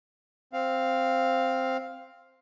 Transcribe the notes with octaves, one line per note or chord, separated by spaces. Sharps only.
C4 F5